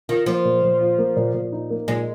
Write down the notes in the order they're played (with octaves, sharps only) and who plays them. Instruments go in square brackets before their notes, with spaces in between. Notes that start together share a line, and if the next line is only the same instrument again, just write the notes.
[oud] D#3 [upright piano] F4
[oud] F3 [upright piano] A#3
[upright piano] A#2
A#2
F4
A#3
A#2
A#2
D#4
A#3
[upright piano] A#2 [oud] G#3